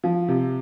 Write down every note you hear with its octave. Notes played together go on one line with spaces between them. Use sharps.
F3
C3